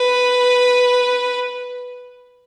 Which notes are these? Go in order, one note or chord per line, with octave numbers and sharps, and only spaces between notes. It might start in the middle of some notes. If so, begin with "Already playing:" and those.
Already playing: B4